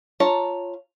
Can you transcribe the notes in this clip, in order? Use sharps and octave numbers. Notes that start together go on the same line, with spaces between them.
F4 C#5 A5 A#5